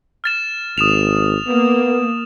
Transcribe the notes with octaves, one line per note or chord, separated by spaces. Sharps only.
F6 A6 E7
G#1 D#6 E7 F7
A#3 B3